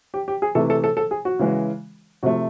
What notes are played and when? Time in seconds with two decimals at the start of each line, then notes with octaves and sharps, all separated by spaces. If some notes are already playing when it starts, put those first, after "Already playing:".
0.14 G4
0.28 G4
0.42 G#4
0.55 C3 E3 A3 A4
0.70 A4
0.84 A4
0.97 A4
1.11 G#4
1.25 F#4
1.39 C#3 E3 G#3
2.23 C3 F3 A3 F#4